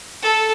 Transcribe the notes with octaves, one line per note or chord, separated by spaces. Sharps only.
A4